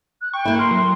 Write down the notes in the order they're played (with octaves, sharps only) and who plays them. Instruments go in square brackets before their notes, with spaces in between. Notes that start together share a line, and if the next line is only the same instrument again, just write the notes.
[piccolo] F#6
[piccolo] G5 [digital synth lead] C#6
[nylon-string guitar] A#3 E4
[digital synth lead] A#4 [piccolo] C6
[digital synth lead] F#3